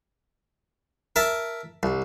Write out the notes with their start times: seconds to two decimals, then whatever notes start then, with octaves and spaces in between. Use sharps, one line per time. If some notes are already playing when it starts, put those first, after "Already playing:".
1.16 A#4 E5 A5
1.83 C2